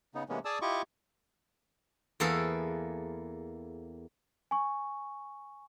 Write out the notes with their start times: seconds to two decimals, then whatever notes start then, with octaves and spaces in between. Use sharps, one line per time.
0.15 C#3 B3 D#4
0.29 C3 E3 G#3 A#3 B3 C#4
0.45 G#4 D5 G#5 A5 D#6 E6
0.62 E4 F4 G4 D#5 C#6 D6
2.20 E2 A#3 G#4 A4 B4 F5
4.51 G#5 C#6